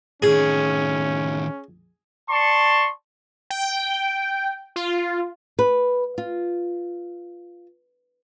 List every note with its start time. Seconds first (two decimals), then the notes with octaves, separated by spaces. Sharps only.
0.22 A2 D#3 C#4 G#4
2.30 D5 A5 C6 C#6
3.50 G5
4.76 F4
5.59 B4
6.18 F4